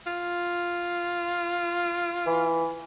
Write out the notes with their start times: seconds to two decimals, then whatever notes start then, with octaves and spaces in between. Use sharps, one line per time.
0.06 F4
2.26 E3